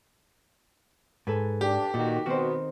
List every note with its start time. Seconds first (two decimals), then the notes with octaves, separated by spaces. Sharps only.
1.27 G#2 A4 B4 G#5
1.61 D4 G4
1.94 A#2 D#3 F#4
2.26 B2 D#3 B3 C4 F#4 C5